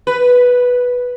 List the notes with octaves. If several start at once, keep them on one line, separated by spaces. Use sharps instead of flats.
B4